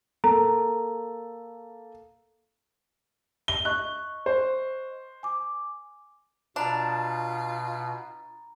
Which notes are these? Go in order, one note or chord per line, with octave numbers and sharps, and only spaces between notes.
A#3 A4 A#5
G7
D#5 C#6 F#6
C5
G#5 D6
B2 D4 F4 A#5 B5